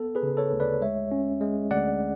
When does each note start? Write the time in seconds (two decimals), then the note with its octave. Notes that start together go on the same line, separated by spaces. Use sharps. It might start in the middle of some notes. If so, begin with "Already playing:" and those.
Already playing: B3 A4
0.15 G#4 B4
0.23 C#3
0.37 A4 C#5
0.52 D2
0.60 B4 D5
0.81 G#3 C#5 E5
1.11 C#4
1.41 G#3
1.71 D2 D5 F#5